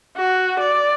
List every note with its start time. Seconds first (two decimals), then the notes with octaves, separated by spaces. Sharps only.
0.17 F#4
0.59 D5